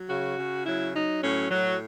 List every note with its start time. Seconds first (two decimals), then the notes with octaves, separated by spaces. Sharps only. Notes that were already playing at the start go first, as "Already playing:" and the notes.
Already playing: F#3
0.09 C#3 F#4
0.39 C#3
0.66 F#3 E4
0.94 F#3 D#4
1.23 A2 C#4
1.51 A2 F#3